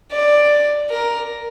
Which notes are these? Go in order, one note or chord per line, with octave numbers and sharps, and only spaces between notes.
D5
A#4